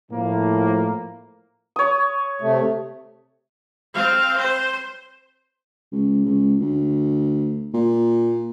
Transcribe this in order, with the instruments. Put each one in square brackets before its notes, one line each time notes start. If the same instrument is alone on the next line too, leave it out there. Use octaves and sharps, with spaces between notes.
[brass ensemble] A2 F3 A#3
[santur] C#5 D#6
[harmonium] C3 A3
[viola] C4 F5
C5
[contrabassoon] C#2
C#2
D2
A#2